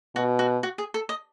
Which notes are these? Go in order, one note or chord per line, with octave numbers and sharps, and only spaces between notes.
B2 F#4
F#4
F#4
G#4
A4
D#5